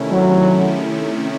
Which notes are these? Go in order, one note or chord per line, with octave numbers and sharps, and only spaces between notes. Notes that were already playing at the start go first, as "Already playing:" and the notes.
Already playing: C3 D#3 A3 C#4 E4
F#3